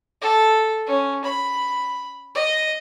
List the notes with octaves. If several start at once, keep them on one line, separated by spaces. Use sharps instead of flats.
A4
C#4
B5
D#5